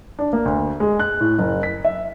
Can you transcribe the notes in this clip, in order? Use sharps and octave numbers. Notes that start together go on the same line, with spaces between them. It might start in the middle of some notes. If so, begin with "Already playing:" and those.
D4
A#3
D2
G#3
F#6
A2
F#1
B6
E5